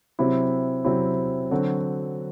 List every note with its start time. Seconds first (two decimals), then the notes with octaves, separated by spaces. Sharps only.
0.19 C3 F#3 C4 E4
0.84 C3 F#3 C4 E4
1.51 D3 F#3 C4 F#4